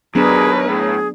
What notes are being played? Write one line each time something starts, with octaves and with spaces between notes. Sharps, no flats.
D#2 F#3 B3 D4 G#4 A#4 B4
A2 G#4